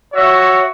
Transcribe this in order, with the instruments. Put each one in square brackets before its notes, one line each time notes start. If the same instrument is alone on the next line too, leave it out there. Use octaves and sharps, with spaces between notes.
[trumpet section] F#4 C#5 E5